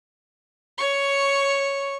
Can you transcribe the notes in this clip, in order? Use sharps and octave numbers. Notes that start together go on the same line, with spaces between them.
C#5 C#6